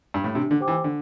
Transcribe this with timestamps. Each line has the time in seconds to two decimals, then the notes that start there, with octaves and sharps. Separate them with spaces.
0.14 G2
0.24 A2
0.34 C3 D4
0.51 D3
0.60 G4 C5 G5 D6
0.68 E3
0.84 D3 D4